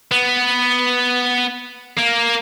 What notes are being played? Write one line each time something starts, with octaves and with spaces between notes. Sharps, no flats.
B3
A#3